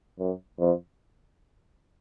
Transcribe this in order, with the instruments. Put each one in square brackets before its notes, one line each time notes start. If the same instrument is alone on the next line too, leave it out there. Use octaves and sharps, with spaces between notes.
[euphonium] F#2
F2